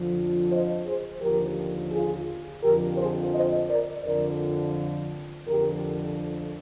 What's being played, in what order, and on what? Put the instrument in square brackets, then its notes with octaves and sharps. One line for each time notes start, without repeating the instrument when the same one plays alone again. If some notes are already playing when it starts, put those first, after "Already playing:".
Already playing: [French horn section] F2 D3 F3
C5 D#5
G#4 C5
D#2 D3 F3 G4 A#4
F4 G#4
F2 D3 F3 G4 A#4
G#4 C5
C5 D#5
A#4 D5
F2 D3 F3 A#4 D5
F2 D3 F3 G4 A#4